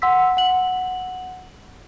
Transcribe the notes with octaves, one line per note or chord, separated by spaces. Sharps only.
F#5 C6 E6 B6
F#5 F#7